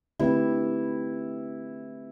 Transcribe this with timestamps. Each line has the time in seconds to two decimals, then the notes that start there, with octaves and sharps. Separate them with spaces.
0.19 D3 A3 C4 E4 G4 B4